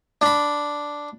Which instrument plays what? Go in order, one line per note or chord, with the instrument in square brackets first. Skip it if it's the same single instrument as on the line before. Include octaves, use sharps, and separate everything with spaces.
[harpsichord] D4 B5